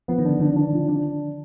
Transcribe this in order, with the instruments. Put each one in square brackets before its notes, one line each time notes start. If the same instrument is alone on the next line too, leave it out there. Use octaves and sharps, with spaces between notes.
[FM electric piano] F3 [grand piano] B3
[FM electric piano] D#3
[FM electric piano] D3 [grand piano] D4
[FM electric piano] D#3 [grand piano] D4
[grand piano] D4
F3
D4